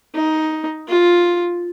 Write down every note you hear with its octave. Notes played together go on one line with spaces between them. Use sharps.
D#4
F4